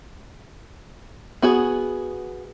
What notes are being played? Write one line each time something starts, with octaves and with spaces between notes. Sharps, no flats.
B3 F#4 G#4